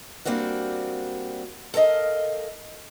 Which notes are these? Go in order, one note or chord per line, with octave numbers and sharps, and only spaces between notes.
G3 A#3 C4 D4 F#4
A4 A#4 C#5 D#5 F5